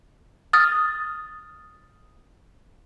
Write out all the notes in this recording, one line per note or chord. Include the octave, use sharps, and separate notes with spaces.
D#6 F6 A6